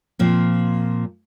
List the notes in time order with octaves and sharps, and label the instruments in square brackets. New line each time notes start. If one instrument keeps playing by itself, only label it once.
[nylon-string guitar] A#2 F3 C4